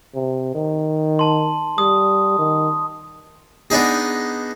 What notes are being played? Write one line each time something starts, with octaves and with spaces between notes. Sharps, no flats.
C3
D#3
A5 C6
G3 D#6
D#3
B3 D4 D#4 G#4